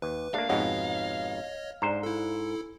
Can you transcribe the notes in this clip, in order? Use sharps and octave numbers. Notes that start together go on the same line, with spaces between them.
D#2 B4
A3 A#3 D4 F5
F2 G#2 B2 D#4 G#4 C#5 D#5 F#5
G#2 D4 C5 A#5
E4 A4